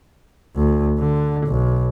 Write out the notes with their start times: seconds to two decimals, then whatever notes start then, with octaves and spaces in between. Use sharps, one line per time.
0.56 D2
0.98 D3
1.47 B1